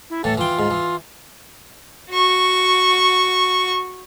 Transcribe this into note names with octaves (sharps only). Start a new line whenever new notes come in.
E4
A2 E3 A4
E3 F4 G5
G#2
E3
F#4 C#6